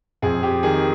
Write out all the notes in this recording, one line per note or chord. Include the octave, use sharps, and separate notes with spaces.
F2 G#4
G4
D#3 G#4